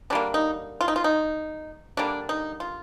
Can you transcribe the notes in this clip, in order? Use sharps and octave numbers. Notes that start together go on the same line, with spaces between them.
D3 G3 A#3 D4
D#4
F4
D#4
F4
D#4
D3 G3 A#3 D4
D#4
F4